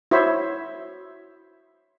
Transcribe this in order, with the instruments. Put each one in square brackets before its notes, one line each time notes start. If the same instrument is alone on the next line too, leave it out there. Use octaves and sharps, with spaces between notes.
[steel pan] E4 F#4 C5 C#5 E5